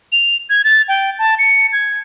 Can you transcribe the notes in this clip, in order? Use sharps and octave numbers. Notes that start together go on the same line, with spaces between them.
F7
G#6
A6
G5
A5
C#7
G#6